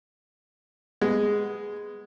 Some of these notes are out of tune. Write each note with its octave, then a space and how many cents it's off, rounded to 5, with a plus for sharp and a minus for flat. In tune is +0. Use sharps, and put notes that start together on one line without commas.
G#3 +0 B3 +15